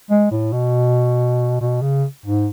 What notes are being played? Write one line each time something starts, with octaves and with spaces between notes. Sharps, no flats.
G#3
A2
B2
B2
C#3
G#2